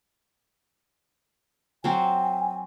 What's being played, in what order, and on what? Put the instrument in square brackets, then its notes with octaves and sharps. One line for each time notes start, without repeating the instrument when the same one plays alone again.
[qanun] F#3 C4 [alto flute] G#5